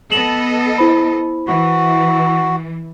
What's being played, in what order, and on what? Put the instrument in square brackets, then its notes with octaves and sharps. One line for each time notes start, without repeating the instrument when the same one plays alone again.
[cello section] B3 A4 D#5 [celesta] E7 F#7
[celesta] E4 C5 B5
[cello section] E3 [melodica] F#4